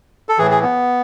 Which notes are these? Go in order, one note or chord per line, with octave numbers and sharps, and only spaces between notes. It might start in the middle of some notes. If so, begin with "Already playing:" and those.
A4
A2 E3 G#4
G#4
B3